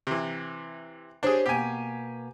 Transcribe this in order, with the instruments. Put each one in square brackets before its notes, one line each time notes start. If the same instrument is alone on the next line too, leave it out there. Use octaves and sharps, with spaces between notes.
[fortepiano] C3 E3
[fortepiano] D4 G#4 [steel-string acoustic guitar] G4 C5 C#5
[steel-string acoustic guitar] B2 A#3 [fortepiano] G4 G#5